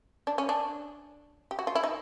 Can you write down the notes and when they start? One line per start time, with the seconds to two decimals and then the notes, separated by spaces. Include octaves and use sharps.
0.27 D4
0.38 C#4
0.49 D4
1.51 G4
1.59 F#4
1.67 F4
1.75 E4
1.83 D#4